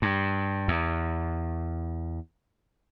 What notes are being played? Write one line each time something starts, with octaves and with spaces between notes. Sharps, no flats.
G2
E2